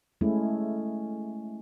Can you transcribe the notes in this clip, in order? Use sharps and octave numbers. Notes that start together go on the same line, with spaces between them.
G#3 A3 C#4 E4